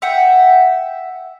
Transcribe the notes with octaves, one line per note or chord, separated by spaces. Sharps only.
E5 F#5 G5